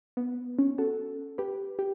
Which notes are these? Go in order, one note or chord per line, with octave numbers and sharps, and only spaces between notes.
B3
C#4
F#4 A4
G4 B4
G4